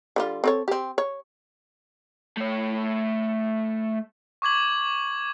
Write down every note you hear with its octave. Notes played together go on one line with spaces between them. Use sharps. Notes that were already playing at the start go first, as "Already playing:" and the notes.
D3 G3 F4
C4 A4 C#5
C4 G4
C#5
A3 C#5
C#6 D6 G#6 F#7